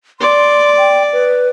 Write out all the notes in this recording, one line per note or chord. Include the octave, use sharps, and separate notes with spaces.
D5 C6
G5
B4